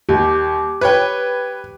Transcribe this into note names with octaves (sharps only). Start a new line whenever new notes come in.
D#2 G4
B4 C#5 G5